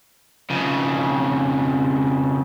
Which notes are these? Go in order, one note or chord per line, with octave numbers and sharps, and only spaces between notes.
F2 C#3